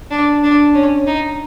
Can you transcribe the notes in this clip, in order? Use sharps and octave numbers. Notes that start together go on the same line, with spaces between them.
D4
D4
C#4
D#4